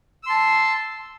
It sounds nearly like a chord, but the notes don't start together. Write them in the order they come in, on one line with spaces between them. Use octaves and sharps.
E6 C6 A5